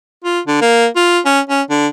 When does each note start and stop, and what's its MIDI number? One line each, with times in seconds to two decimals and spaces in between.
0.24 0.40 65
0.47 0.58 50
0.61 0.87 58
0.96 1.19 65
1.25 1.40 61
1.49 1.62 61
1.70 1.87 50